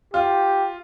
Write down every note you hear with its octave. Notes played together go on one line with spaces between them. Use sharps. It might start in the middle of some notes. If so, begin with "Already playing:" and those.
F4 G4